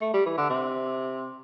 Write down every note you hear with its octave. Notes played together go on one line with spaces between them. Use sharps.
A3
G3
E3
D3
C3